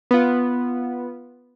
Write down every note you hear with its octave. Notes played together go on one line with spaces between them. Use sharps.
B3 F4